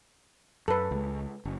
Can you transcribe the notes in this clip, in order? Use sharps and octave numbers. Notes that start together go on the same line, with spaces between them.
F#2 A4 B4
C#2 G#3
F#1